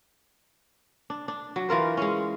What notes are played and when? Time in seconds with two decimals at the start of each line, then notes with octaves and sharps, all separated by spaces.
1.10 D4
1.28 D4
1.56 F#3
1.69 E3 F4 A#4 C5
1.97 G#3 C#4